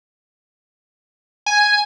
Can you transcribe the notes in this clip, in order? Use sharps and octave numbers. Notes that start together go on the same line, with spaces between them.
G#5